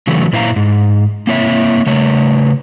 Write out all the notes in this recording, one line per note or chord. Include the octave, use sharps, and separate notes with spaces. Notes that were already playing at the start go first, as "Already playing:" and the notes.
C#3 E3 F#3 A3
A#2 E4 C5 E5 F5 A#5
G#2
A#3 C4 E4 C#5 E5
C#3 A3 C#5